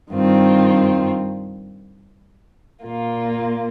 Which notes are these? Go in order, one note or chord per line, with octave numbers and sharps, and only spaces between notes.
G2 D#3 C4 F4
A#2 A#3 F4